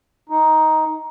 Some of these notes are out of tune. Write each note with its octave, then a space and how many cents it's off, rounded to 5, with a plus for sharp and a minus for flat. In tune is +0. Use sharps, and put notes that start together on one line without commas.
D#4 +10